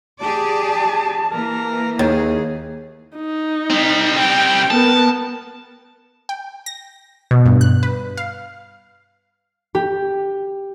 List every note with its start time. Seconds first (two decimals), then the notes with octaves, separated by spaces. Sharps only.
0.22 G4 G#4 D5 A5
1.32 E3 A#3 A#4
1.99 D#2 G#4
3.17 D#4
3.70 G3 C4
4.18 G5
4.70 B3 A#4 A5
6.29 G5
6.66 A#6
7.31 B2
7.46 G2
7.61 F#6
7.83 B4
8.17 F5
9.75 G4